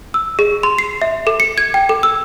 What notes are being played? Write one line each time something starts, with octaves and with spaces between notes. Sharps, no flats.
E6
G#4
C6
C7
E5
A4
C#7
G#6
G5
A4
E6